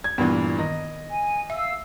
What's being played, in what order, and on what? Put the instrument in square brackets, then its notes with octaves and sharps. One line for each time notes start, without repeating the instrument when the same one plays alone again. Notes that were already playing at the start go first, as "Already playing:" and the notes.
[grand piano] G#6
[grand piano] G2 A#2 E3 [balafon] B3
[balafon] D#3 [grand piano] D#5
[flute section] G#5
[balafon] E5 [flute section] F5 E6